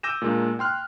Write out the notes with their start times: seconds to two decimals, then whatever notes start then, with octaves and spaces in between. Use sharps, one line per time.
0.03 D6 E6 G6 A#6 D#7 E7
0.22 A#2 G#3 A#3 D4
0.59 G5 C6 F6 F#6